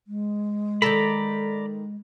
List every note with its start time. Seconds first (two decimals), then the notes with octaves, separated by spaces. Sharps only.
0.07 G#3
0.82 D#3 A4 D5 A#5 B5